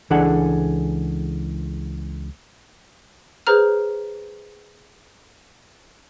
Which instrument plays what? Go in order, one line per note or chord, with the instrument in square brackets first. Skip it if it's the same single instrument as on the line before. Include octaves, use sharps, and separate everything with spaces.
[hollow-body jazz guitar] C#2 E3 D4 G#4 A4 F#5
[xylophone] G#4 B4 C5 A#5 F6